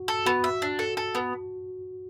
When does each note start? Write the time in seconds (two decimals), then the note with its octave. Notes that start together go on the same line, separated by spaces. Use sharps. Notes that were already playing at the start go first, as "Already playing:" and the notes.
Already playing: F#4
0.08 A4
0.26 B3 F#4
0.44 E5
0.62 D4
0.79 A4
0.97 A4
1.15 B3